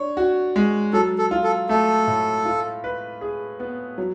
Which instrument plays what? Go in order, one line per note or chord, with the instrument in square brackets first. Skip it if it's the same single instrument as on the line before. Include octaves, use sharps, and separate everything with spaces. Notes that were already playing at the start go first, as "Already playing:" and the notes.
Already playing: [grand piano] D4 C#5
F#4
G#3
[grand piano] F#3 [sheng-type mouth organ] A4
[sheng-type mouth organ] A4
[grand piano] F4
[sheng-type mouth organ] A4
[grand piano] A3 [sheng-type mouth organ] A4
[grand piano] A2
F4
B4
G#4
B3
F#3